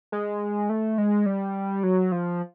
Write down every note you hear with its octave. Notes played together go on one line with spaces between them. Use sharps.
G#3
A3
G#3
G3
F#3
F3